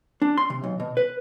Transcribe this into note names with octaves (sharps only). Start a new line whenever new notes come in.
D4
C6
C3
B1
B2
B4